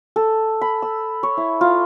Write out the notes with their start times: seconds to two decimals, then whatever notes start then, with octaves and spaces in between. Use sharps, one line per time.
0.16 A4
0.61 B5
0.82 E6
1.23 C#5
1.37 E4
1.61 F4